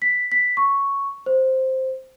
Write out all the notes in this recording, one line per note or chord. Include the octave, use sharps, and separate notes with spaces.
B6
B6
C#6
C5